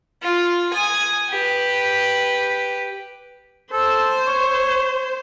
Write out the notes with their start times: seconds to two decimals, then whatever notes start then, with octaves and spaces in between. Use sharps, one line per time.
0.23 F4
0.73 G#5 D#6
1.30 G4 B4
3.73 A4 C5
4.27 C#5